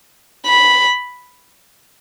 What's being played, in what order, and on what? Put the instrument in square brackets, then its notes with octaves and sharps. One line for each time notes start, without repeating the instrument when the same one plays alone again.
[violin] B5